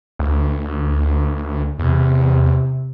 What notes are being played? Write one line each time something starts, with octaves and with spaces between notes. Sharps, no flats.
D2
E2 C3